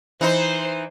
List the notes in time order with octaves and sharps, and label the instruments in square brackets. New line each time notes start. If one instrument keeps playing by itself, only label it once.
[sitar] E3 D#4 [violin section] C5